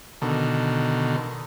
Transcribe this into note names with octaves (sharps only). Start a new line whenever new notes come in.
B2 D3 D#3